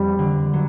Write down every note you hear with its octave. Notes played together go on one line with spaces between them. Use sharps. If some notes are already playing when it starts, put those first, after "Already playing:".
Already playing: F2 G3
D3
F#3